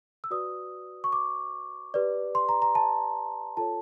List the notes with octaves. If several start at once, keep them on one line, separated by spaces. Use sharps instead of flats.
E6
F#4 B4 D5 D#6
C#6
D6
G4 B4 D5
C6
A#5
A#5
A5
F4 A4 C#5 A5